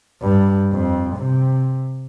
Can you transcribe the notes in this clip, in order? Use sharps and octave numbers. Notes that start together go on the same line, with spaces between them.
G2
F2
C3